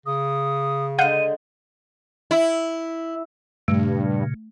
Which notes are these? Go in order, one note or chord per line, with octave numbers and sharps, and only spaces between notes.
C#3 D#6
D3 G#3 F5 F#5 G6 D#7
E4
G2 A#2 C#3 A3